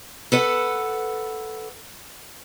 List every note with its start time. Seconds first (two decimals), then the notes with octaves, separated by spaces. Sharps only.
0.32 A4 B4 F#5